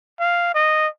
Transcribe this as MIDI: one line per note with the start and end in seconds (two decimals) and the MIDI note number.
0.19 0.54 77
0.54 0.87 75